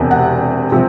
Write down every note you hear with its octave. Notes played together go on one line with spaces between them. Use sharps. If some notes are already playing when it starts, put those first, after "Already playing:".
Already playing: E1 E2 C3
F#5
C3 F3